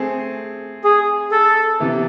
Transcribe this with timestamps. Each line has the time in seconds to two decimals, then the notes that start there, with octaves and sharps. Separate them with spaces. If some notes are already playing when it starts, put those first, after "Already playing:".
Already playing: A3 C4 G#4
0.84 G#4
1.32 A4
1.80 C3 E3 B3 E4